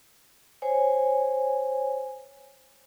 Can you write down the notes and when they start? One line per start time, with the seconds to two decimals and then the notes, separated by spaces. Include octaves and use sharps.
0.62 C5 C#5 G#5